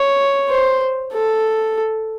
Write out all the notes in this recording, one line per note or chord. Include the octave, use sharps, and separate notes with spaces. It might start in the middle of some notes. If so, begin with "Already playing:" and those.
Already playing: C#5
C5
A4